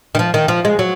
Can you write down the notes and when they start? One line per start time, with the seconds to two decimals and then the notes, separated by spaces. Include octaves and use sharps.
0.15 D#3
0.19 F3
0.34 D#3
0.48 F3
0.65 G#3
0.79 F#3